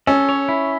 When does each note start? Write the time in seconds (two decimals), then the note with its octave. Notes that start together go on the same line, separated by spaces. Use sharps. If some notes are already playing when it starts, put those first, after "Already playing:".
0.07 C#4 A4
0.29 C#5
0.48 E4